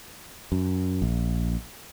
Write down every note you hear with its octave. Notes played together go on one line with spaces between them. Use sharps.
F#2
A#1